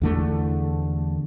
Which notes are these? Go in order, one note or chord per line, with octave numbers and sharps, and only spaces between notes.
E2 D3 A3